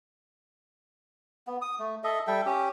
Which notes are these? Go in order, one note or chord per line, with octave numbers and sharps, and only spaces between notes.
B3
D#6
A3
A4 D#5 E5
G3 A4 E5 G5
C#4 G4